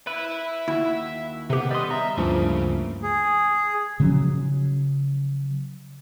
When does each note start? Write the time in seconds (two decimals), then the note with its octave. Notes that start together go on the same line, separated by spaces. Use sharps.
0.07 B4 E5 B5
0.68 D#2 E4 F#4
1.50 C3 B3 G4
1.71 G3 D#5 C6 D#6
1.91 E5 A#5
2.17 D2 G2 C#3 F3 A3 A#3 E4
3.03 G#4
4.00 C#3 F3 F#3 C#4